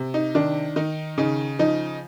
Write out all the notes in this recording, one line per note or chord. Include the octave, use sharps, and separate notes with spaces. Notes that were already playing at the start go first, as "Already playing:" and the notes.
Already playing: C3
D#4
D#3 D4
D#3 D#4
C#3 D#4
F3 D#4